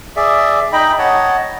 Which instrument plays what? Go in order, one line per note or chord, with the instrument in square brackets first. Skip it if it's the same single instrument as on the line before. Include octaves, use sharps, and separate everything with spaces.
[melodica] G#4 D5 E5
D#4 D#5 G5 B5
C#5 D#5 F#5 A5